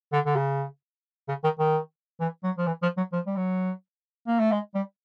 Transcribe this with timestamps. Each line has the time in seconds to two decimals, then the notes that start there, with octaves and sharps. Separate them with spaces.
0.13 D3
0.26 D3
0.36 C#3
1.28 C#3
1.44 D#3
1.59 D#3
2.21 E3
2.44 F#3
2.58 F3
2.67 E3
2.83 F3
2.97 F#3
3.13 F3
3.26 G3
3.36 F#3
4.28 A#3
4.39 A3
4.52 G#3
4.75 G3